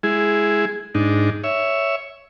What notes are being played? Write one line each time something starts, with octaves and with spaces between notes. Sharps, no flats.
G#3 E4 G#4
G#2 D4 D#4
C#5 E5